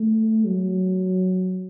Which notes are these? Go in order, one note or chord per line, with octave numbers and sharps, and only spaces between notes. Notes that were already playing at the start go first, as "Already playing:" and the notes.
Already playing: A3
F#3